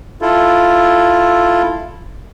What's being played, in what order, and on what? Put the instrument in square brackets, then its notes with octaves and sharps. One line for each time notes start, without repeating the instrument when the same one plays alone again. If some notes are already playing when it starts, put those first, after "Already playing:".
[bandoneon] E4 F4 A4